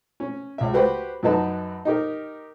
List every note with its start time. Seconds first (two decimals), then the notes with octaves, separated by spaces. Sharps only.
0.20 C#4
0.58 C#2 E5
0.73 F#4 G4 B4 C5 G5
1.23 F#2 F#3 D#4 B4 A5
1.85 D#4 G4 A#4